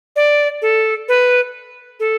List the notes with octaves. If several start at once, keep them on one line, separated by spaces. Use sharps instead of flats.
D5
A4
B4
A4